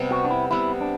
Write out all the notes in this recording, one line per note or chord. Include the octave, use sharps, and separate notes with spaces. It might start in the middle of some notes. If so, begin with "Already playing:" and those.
Already playing: C3 G3 B3
F#4
D4
E4
C3 G3 B3 E4
D4